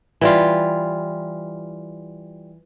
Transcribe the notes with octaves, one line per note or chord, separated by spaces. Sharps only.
E3 G3 F4